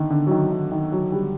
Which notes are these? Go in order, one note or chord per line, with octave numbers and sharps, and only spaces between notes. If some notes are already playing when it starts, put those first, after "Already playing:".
Already playing: D3 D#3
D3
F#3
D#3
D#3
D#3
F#3
G3